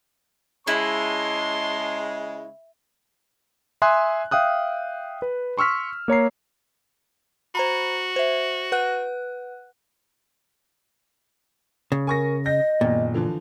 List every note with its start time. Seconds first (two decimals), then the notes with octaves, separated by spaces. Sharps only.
0.67 C#3 G#3 E4 A5 C6
3.82 E5 G#5 C6 D#6 F#6
4.31 E5 F5 G5 D#6 F#6
5.22 B4
5.58 C6 C#6 E6 F6 B6
6.08 A#3 C#5 A#5 C7
7.55 F#4 C5 A#5 B5
8.16 C5 E5
8.72 B4 F#5 F#6
11.92 C#3
12.07 A#4 G#5 C#6 A#6
12.46 D#5 G6 A#6
12.81 F#1 A#2 D#3 B3
13.14 D3 E3 F3